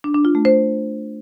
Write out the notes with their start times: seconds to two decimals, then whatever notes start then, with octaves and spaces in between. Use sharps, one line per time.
0.04 D4
0.14 D4
0.25 F4
0.35 A3
0.45 C5